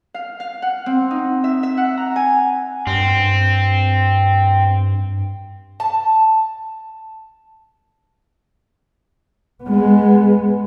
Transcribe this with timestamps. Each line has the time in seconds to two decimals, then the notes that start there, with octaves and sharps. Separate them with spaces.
0.14 F5
0.40 F5
0.62 F#5
0.86 C4
1.11 D#4
1.44 E5
1.63 E5
1.77 F#5
1.97 A#5
2.16 G#5
2.87 G2 C4
5.80 A5
9.64 G#3 B3